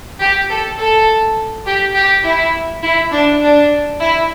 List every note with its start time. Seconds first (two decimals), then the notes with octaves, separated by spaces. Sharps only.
0.20 G4
0.49 A4
0.77 A4
1.66 G4
1.95 G4
2.24 E4
2.82 E4
3.12 D4
3.41 D4
4.00 E4